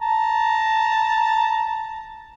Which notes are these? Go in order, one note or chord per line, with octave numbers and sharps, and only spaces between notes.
A5 A#5